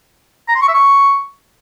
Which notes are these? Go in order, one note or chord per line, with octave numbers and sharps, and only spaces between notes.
A#5
C6
C#6
E5
C#6